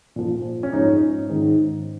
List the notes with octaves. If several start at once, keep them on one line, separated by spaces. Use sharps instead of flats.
A#2 F3
C#4
G#2 F3 D#4
G#2 D#3